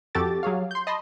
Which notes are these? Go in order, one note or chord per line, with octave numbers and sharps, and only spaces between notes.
F2 F#4 G4 A4 D6 A6
F#3 G#4 C#5 F5
C6 G6
D#5 A5 B5 C6